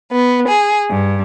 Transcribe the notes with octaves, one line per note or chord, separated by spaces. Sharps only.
B3
G#4
G2